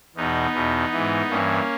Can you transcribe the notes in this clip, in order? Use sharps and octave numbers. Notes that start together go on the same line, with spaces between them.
E2 B2 B3 D#4
E2 B2
G#2 E3
G2 E3 A#3 C#4